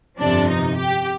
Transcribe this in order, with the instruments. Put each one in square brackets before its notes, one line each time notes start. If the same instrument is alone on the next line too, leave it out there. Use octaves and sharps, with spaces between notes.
[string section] G1 F2 C3 F3 D4
D#4
G4